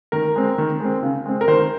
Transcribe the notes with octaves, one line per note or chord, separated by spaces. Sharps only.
D#3 A#4
G#3 C4
D#3
G#3 C4
C#3
G#3 C4
A#4
D#3 C5